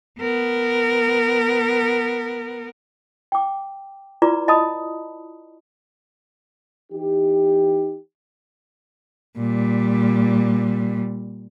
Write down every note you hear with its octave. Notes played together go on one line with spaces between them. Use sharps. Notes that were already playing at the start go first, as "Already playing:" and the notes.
B3 A#4
G5 D6
E4 F4 B4 D5 A#5 D6
D#5 A5 B5 D#6
E3 D#4 G4
A#2 G3